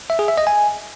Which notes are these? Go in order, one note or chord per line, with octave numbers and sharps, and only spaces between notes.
E5
G#4
E5
D#5
G#5